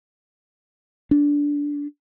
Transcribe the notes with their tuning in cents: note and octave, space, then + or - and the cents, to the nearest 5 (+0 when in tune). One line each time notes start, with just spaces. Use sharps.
D4 -15